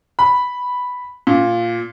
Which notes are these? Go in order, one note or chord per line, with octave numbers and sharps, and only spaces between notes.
B5
A#2